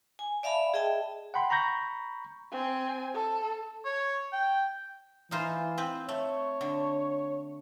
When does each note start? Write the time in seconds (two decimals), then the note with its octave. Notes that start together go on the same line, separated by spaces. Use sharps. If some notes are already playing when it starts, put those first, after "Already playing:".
0.19 G#5
0.43 D5 E5 F5 A5 B5
0.74 G#4 D#5 E5 G5 A5
1.34 F#5 G5 B5 C6
1.50 A#5 B5 C#6 G6 A#6
2.51 C4 G#5
3.14 A4
3.85 C#5
4.33 G5
5.31 E3 D#4 F4 C5
5.78 C4 B4
6.09 A3 C#5
6.61 D3